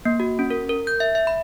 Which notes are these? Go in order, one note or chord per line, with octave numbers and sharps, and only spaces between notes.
A#3
F#4
C#4
A#4
A#4
G6
E5
E5
B5